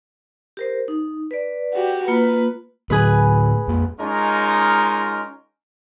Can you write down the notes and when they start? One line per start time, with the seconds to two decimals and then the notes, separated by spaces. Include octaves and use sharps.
0.57 G4 A#4 C5
0.88 D#4
1.31 B4 D5
1.74 F#4 G4
2.08 A#3 F4 B4
2.90 A2 D3 A3 G#4 B4
3.68 F2 A#3
4.00 G#3 C#4 D#4 F4 A#4